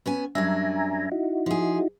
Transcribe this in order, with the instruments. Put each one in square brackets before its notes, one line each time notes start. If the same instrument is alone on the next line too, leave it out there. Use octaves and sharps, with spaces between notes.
[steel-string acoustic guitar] B3 C#4 G#5
[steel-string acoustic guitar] F#2 G3 D4 [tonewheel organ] E5 G#5 A#5
[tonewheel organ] D#4 E4 F#4
[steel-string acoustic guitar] F3 G#4